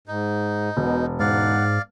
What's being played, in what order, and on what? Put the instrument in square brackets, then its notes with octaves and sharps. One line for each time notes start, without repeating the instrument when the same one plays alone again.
[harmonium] G#2 [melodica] D#4
[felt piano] E1 [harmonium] B2
[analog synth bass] G#2 [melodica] D5 F5 [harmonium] F#5